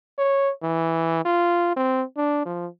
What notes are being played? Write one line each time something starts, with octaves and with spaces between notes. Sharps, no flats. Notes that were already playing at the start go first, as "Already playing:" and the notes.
C#5
E3
F4
C4
D4
F3